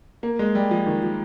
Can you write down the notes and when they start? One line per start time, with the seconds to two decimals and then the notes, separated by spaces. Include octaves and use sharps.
0.23 A#3
0.39 G#3
0.55 G3
0.71 F3
0.86 D#3
1.03 F3